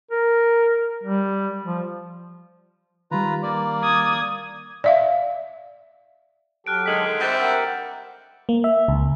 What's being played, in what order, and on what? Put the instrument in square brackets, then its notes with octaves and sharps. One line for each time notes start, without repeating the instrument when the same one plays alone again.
[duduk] A#4
G3
F3
[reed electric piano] D#3 G3 [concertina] F4 B4 A#5
[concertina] A#3 D5
[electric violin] D#6 G#6
[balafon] D5 E5 F5
[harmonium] F#3 G4 A4 [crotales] F6 F#6 D7
[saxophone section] D3 D#3 G#3 [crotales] B6 F#7
[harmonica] G3 C4 E5 [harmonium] C5 [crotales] F#6 G6 A6
[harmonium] G4 A#4 F#5 [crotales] G6
[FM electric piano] A#3
E5
C#2